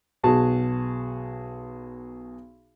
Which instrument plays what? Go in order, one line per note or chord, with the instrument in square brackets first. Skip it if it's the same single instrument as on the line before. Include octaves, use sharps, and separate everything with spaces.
[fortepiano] B1 F#4 G#4 A5